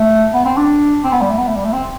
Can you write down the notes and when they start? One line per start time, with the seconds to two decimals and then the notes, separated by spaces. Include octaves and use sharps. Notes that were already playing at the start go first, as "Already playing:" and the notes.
Already playing: A3
0.34 B3
0.45 C4
0.57 D4
1.04 C4
1.13 B3
1.21 G3
1.30 A3
1.38 B3
1.47 A3
1.56 G3
1.65 A3
1.73 C4